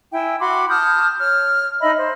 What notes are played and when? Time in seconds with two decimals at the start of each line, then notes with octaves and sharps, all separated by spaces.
0.13 E4 E5 G5 G#5
0.39 F#4 B5 C6 D6
0.70 A5 D#6 F6 G6
1.20 C#5 F6
1.81 D#4 D#5 E5 B5
1.97 C5